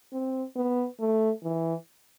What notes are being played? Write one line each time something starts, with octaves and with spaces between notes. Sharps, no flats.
C4
B3
A3
E3